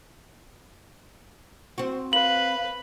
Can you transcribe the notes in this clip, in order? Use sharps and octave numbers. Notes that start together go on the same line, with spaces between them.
C4 F#4
B4 F5 F#7